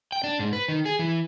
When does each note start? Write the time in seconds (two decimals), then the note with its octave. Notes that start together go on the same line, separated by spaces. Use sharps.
0.12 G5
0.24 D4
0.39 G#2
0.53 B4
0.68 D#3
0.86 G#4
0.99 E3